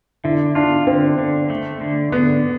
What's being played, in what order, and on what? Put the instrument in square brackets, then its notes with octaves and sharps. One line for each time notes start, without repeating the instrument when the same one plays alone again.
[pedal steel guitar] D3 [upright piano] E4
[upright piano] D4 [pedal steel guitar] F4
[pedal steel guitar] D3 [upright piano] C4
[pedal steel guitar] D3
A3
D3
[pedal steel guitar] D3 [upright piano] B3